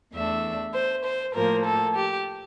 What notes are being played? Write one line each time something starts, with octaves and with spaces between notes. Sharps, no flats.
E2 E3 A3 D4 E5
C5
C5
A2 F3 A#3 A#4
A4
G4